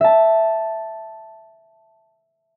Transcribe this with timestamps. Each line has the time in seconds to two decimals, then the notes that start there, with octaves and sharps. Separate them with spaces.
0.01 E5 A5